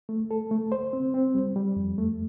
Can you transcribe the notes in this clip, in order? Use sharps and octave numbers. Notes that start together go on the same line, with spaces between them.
A3
A4
A3
C5
C4
C4
G3
G3
F2
A3